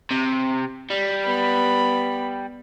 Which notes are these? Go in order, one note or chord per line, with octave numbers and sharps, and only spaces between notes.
C3
G3
B3 B5